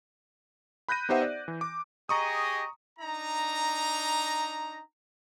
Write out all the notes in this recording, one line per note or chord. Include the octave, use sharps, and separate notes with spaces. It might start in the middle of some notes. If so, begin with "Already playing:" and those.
B5 F#6 G6 A#6 D#7
B3 D#4 G4 C5 E5 F#5
D5
E3
D6
G4 G#4 D#5 A#5 C#6 D#6
D4 D#4 A#5